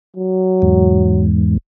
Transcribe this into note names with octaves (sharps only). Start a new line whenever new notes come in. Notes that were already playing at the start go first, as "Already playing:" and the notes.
F#3
E2 G#2